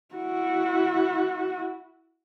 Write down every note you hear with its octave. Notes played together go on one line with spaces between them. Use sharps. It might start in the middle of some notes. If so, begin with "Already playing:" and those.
E4 F#4